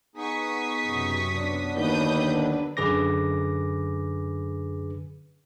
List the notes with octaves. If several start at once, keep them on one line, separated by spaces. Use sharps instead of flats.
B3 D#4 G#4 C#6 D#6 B6
B1 F#2 C3
F#3 B3 D4
D#2 D3 B4 D#6 G6
F#2 D3 G#4 B4 D6 A#6